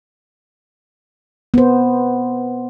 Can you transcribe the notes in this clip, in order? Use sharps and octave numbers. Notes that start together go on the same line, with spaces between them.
B3 C5